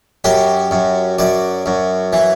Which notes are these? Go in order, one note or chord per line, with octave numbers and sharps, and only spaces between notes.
F#2 G4
F#2
F#2 D5
F#2
E3